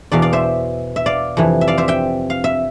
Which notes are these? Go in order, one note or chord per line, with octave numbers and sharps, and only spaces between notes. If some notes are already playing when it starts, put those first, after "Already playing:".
E2 B2 D5 F5
D5 F5
C5 E5
E5
D5 F5
F2 C3 E3
E5
D5 F5
C5 E5
E5 G5
F5
E5